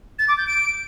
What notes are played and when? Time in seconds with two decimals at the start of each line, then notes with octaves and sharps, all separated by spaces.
0.19 A6
0.28 D6
0.38 G6
0.47 D7